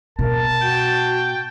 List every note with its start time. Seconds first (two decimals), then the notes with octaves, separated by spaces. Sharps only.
0.19 B2 A#4 A5
0.61 F#4 G5